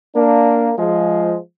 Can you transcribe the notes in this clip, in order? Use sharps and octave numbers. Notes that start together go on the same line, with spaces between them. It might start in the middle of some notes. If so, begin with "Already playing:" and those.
A#3 D4
F3 G#3